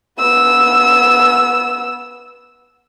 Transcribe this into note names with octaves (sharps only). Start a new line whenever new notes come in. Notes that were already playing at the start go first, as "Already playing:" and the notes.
B3 E6